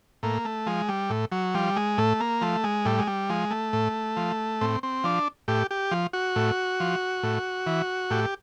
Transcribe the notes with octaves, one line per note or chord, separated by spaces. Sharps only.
A2 A#3
A3
F3 G#3
G3
A2
F#3
F3 G3
G#3
A2 A3
A#3
F3 A3
G#3
A2 G3
G#3
G3
F3 G#3
A3
A2
F3
A2 C4
C4
F3 D4
A2 G4
G4
F3
F#4
A2
F3
A2
E3
A2 G4